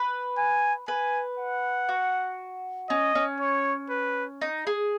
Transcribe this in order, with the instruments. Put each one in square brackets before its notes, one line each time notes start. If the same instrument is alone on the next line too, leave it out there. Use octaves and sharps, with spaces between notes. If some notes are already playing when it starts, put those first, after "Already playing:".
Already playing: [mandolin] B4
[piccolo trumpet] G#5
[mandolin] B4 [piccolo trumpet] G#5
[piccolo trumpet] F#5
[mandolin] F#4
[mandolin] C#4 [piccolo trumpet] D#5
[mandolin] C#4
[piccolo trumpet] C#5
B4
[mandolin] D#4
G#4